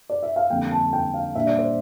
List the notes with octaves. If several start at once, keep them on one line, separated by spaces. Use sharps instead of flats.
D5
E5
F5
F2 D3 G3 A#3 D4 G5
A5
G5
F5
A#2 G3 D4 E5
D5
C5